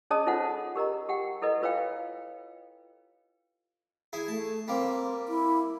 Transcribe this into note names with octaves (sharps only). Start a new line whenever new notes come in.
C#4 G#4 C#5 D#5 A5 D#6
D#4 F4 A4 C5 F#5 A5
G4 A#4 D#5 A#5
G4 F#5 G5
E4 A4 B4 D#5
F4 B4 C#5 F5 G5
E4 G#4
A3 A5
G3 A#3 C4
E4